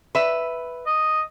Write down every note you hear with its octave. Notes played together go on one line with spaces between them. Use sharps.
B4 E5
D#5